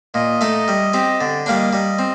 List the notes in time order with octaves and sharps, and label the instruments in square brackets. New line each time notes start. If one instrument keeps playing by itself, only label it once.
[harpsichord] A#2 [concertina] D#5
[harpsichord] A3 D#4 A4
G3
C4 G4
[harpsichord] D3 [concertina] D5
[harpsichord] G3 A#3 D4
[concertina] D#5
[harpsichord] G3 [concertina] D#5
[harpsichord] C4